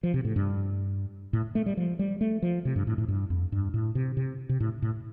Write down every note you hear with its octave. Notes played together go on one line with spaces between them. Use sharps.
F3
C3
A2
G2
A2
A3
G3
F3
G3
A3
F3
C3
G2
A2
A2
G2
F2
G2
A2
C3
C3
C3
A2
A2